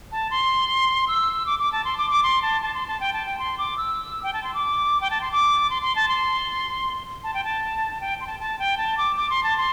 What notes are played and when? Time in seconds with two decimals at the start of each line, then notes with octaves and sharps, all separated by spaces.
0.12 A5
0.31 C6
1.08 E6
1.46 D6
1.59 D6
1.72 A5
1.85 C6
1.97 D6
2.10 D6
2.23 C6
2.42 A5
2.62 A5
2.74 C6
2.87 A5
3.00 G5
3.13 A5
3.26 G5
3.39 C6
3.58 D6
3.78 E6
4.23 G5
4.34 A5
4.44 C6
4.54 D6
5.01 G5
5.11 A5
5.21 C6
5.32 D6
5.70 C6
5.82 C6
5.96 A5
6.09 C6
7.24 A5
7.34 G5
7.44 A5
8.01 G5
8.21 C6
8.27 A5
8.40 A5
8.59 G5
8.78 A5
8.97 D6
9.16 D6
9.30 C6
9.43 A5
9.58 C6